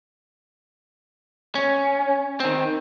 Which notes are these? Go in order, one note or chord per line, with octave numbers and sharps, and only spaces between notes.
C#4
D#3 C4